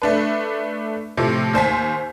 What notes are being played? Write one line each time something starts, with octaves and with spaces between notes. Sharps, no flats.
A3 D4 B4
A2 C3 F3
D#2 C5 G#5 B6